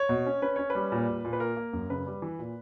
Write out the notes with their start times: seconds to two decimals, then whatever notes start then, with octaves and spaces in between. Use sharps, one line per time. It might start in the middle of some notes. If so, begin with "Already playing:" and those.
Already playing: C#5
0.09 B2
0.26 C#4
0.42 C#4 B4
0.56 C#4 C#5
0.70 B4
0.75 G3
0.92 A#2
1.09 A#2
1.25 A#2
1.33 B4
1.40 A#3 A#4
1.57 A#3
1.73 F#2
1.90 C#3 B4
2.06 G3
2.22 E3
2.39 A#2